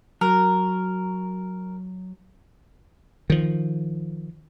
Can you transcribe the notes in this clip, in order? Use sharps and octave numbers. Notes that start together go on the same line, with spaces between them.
F#3 A#4
D#3 F3